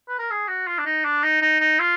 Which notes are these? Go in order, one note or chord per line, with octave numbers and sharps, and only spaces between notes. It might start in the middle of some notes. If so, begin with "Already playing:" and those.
B4
A#4
G#4
F#4
F4
D4
D#4
D4
D#4
D#4
D#4
F4